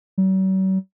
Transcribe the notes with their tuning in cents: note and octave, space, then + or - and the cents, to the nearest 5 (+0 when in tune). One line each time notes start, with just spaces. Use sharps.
F#3 +45